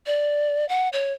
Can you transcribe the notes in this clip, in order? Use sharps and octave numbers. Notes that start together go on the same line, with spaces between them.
D5
F#5
C#5